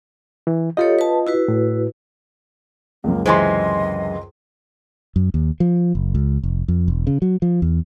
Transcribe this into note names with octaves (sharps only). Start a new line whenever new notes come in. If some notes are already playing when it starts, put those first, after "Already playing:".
E3
F4 G4 A4 C#5 D#5
B4 A5
E4 F#4 B4
A2
C#2 F#2 A#3
C3 E3 G#3 C5 D#5 G#5 C6
F#2
D#2
F3
F#1
C#2
F1
F2
E1
C#3
F#3
F3
E2